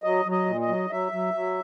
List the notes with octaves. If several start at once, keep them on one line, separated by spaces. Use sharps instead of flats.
F#3 D#5
F#3
D#5
A#2
D#5
F#3
F#3 E5
F#3
F#3